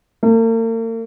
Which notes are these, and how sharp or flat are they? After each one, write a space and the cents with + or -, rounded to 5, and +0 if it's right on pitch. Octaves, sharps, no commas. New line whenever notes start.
A#3 -45